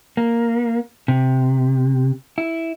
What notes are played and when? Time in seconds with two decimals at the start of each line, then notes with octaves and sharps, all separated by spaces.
0.17 A#3
1.08 C3
2.38 E4